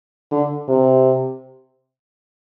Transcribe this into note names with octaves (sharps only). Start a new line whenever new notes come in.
D3
C3